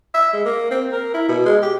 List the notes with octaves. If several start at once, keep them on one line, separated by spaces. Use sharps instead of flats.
E5
G#3
A#3
C4
A#4
E4
B2
G#3
G4